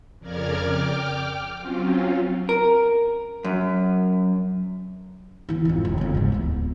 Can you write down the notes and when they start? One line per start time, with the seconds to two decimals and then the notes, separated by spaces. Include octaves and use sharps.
0.19 F2 C#3 A#4 D5 F6 G#6
0.63 G5 D6 F6
1.58 F#3 C4 C#4 F4
2.49 A#4
3.44 F#2
5.49 E3 E4
5.65 F2 G#2
5.85 E1 D2
5.98 F2 C#3
6.15 E2 G#2
6.32 D1 B3